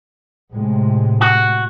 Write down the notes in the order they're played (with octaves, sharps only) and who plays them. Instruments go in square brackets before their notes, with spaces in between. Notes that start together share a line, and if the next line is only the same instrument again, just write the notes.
[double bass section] A2 C3 G#3
[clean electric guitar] F#4